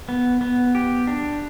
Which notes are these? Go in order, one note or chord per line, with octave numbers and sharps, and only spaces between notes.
B3
B3
G4
D4